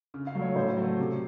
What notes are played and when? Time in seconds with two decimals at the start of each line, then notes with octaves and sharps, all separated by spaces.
0.14 C#3
0.27 F5
0.35 F#3 A3
0.42 C#5
0.55 A2 C5
0.77 F#3 A3
0.98 C3